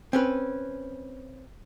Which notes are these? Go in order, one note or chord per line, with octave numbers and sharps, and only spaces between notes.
C4 C#4 B4